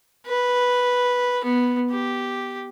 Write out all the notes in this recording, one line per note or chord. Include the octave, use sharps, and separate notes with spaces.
B4
B3
G4